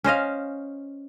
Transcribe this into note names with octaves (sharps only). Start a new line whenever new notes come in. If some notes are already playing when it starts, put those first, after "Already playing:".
C#4 C5 D#5 F5